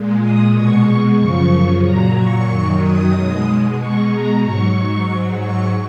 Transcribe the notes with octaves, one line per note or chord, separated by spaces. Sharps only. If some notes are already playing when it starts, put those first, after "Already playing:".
Already playing: A#2 G#3
D#6
B2 G#3 C#6
F#2 C#3 F3 C#6
A#2 F#3 A#5
C#6
F#2 D#3 F#3
D#6
B2 G#3
B2 G#3 C#6
A#5
G#2 F#3 C#6
G#2 F#3
C#6